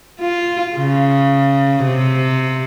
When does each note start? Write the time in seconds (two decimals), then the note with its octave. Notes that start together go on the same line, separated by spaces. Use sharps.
0.20 F4
0.77 C#3
1.85 C3